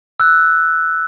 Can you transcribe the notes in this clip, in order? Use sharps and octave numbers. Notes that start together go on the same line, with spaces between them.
E6 F#6